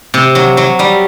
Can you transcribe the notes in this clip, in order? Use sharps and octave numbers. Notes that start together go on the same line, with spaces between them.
C3
F#3
F#3
G3